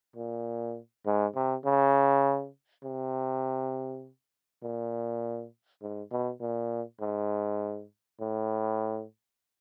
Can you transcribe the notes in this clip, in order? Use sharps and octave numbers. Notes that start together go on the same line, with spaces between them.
A#2
G#2
C3
C#3
C3
A#2
G#2
B2
A#2
G#2
A2